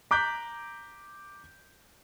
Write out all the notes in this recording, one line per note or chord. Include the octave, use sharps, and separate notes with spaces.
A#5 D6 F#6 G6 B6